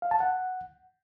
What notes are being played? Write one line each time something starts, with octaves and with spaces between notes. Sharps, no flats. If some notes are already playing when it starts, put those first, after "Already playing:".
F5
A5
F#5